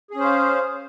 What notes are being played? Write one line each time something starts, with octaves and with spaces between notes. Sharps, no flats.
C#4 G#4 C5 F5